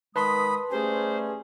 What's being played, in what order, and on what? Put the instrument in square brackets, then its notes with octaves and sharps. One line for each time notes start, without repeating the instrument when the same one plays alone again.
[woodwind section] D#3 G#3 D#6 [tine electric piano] B4 A5 C6 [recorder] B5
[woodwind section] G3 A3 C#4 [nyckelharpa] G#4 [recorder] C5